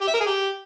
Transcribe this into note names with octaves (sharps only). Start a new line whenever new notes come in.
G4
E5
A#4
G#4
G4